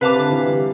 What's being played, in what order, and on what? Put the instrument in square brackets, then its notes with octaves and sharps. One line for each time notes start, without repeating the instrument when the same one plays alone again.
[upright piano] C3 [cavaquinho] B4 F5 A5 D6
[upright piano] D3
E3
G3